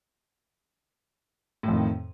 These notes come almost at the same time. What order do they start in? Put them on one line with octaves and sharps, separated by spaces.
A2 F2 D#3